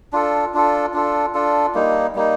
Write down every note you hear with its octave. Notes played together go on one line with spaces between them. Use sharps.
D4 F4 A4
D4 F4 A4
D4 F4 A4
D4 F4 A4
G3 A#3 D#4
G3 A#3 D#4